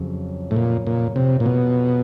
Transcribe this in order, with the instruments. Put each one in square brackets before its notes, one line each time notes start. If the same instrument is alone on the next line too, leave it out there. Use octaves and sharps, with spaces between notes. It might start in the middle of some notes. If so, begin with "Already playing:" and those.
Already playing: [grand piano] F2 C#3 F#3
[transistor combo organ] A2
A#2
A#2
C3
A#2
B2